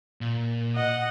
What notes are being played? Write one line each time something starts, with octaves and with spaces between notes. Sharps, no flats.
A#2
D#5 F#5